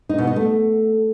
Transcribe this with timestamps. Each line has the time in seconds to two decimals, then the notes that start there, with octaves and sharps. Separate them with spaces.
0.09 D#4
0.18 B2
0.27 D#4
0.36 A3